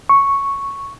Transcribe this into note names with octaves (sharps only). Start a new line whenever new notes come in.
C#6